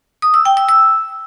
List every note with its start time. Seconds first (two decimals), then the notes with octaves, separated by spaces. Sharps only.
0.22 D#6
0.34 E6
0.45 G5
0.57 E6
0.69 E6